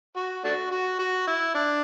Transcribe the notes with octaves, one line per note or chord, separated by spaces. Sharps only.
F#4
A3 D4 F#4
F#4
F#4
E4
D4